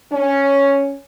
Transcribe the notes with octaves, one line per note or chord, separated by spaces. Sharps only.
C#4